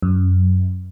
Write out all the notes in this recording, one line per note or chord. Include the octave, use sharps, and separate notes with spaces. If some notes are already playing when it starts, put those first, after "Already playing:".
F#2